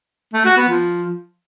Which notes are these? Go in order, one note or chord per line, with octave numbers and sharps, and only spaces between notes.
A3
F#4
B3
F3